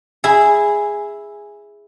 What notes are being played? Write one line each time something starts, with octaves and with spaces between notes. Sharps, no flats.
E4 G#4